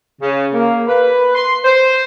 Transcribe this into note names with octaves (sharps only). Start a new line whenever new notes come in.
C#3
A#3
B4
C6
C5